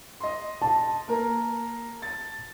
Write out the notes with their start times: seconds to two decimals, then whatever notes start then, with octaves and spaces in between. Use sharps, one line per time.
0.21 D#5 C6
0.62 A5
1.08 A#3 A#4
2.02 A6